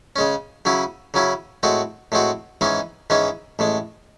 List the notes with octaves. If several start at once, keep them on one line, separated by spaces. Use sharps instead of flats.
C#3 G#3 C#4
C#3 F#3 C#4 E4
C#3 F#3 C#4 E4
A2 G#3 C4 F#4
A2 G#3 C4 F#4
G#2 E3 G#3 C#4
G#2 E3 G#3 C#4
A1 A2 G#3